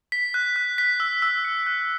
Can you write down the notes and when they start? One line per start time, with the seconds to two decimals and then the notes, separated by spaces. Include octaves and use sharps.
0.12 B6
0.34 F#6
0.56 F#6
0.78 B6
1.00 E6
1.22 E6
1.45 C#7
1.67 F#6